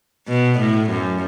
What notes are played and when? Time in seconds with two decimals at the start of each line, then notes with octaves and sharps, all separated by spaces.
0.28 B2
0.59 A2
0.90 F#2